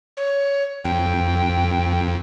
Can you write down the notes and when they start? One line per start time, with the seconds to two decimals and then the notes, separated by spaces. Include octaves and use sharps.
0.17 C#5
0.84 F2 G5